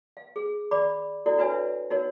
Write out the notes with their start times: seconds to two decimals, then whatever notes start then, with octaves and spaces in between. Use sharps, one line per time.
0.17 F5
0.36 G#4
0.71 D5 B5 D6
1.26 E4 F#4 A4 D5
1.38 D4 F#4 B4 C#5 E5 G#5
1.90 D#4 F#4 A#4 C#5